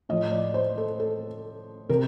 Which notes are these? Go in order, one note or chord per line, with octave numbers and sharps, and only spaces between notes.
A2 F3 D#5
D5
C5
A4
A4
C3 A#4